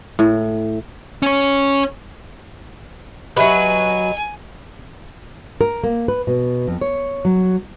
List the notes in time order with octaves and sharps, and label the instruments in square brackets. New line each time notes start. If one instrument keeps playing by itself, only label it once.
[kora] A2
[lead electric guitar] C#4 C#5
[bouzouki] F#3 B4 [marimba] G4 E5 [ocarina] D#5 [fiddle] G#5
[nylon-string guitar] A#4
A#3
B4
B2
F2
C#5
F#3